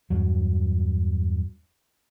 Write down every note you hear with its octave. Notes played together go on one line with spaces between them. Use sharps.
E2 G2 F#3